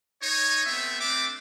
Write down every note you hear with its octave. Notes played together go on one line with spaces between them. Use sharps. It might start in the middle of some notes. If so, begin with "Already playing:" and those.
D#4 C#5
A3 B3 C4 E5
A3 C4 D4 E5 D6